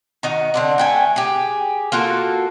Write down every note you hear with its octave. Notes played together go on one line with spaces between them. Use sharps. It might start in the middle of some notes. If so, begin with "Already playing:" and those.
D#3 D#4 F#4
D3 C4 D4
A3 G5 G#5
G4 G#4
A#3 F4 F#4 A4